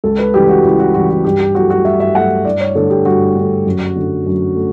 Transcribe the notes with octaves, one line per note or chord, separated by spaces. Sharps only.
C#2 A4
B4
C#3 E3 G3 G4
F#4
C#2 E4
F#4
C#3 E3 G3 F#4
F#4
G2 G4
G4
F#3 A3 F#4
F#4
G2 E5
E5
F#3 A3 F#5
G2 D5
C#5
D3 A3 A4
G4
G2 F#4
D3 A3
F#2
D3 A3
F#2
A3